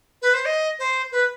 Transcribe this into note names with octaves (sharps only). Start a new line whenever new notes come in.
B4
C5
D#5
C5
B4